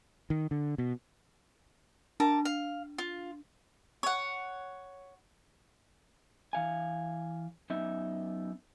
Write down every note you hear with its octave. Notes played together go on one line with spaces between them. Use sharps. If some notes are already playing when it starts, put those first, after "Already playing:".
D#3
D3
B2
D4 A#4 A5 D6
F5
F4
C#5 F#5
E3 F5 G#5
F#2 B3 D#4 E5